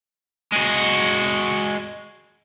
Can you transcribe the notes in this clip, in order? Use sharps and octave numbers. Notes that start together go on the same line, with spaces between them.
G#3 F#4